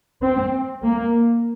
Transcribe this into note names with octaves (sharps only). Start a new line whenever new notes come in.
C4
A#3